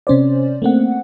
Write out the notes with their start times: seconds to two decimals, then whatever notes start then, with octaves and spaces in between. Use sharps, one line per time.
0.07 C3 C#4 C5 D5
0.62 A3 A#3 C4 F#5